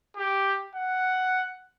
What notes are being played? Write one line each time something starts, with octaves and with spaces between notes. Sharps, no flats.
G4
F#5